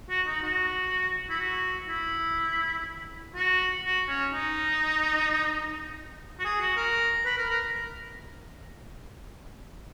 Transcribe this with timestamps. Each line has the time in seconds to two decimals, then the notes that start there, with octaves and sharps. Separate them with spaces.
0.10 F#4
0.26 D#4
0.43 F#4
1.29 E4
1.39 F#4
1.88 E4
3.35 F#4
3.84 F#4
4.08 C#4
4.33 D#4
6.39 F#4
6.44 G#4
6.60 F#4
6.76 A#4
7.25 B4
7.37 A#4
7.50 A#4